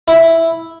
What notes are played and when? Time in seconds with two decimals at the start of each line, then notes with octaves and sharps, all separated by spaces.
0.08 E4